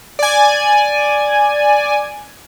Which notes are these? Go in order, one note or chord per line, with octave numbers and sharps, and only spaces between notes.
D5 G#5